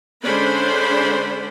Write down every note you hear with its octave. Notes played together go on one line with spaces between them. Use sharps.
D3 G#3 C#4 D4 C5 B5